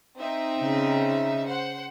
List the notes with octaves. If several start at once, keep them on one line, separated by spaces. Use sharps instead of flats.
C4 D#4 E5
C#3
C5 F#5